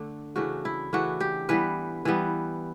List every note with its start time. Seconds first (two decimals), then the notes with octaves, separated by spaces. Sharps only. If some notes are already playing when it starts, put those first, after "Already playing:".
Already playing: D3 A3 D4
0.36 C#3 E3 A3 D4 F#4
0.65 E4
0.93 C#3 E3 A3 D4 F#4
1.20 G4
1.49 E3 G3 B3 B4
2.05 E3 G3 B3